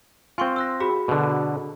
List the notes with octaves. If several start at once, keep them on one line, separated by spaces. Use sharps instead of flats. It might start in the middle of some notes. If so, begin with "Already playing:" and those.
C4 F4 G#5 C6 C#6
E6 F#6 A#6
F#4 G#4 B5
B2 D3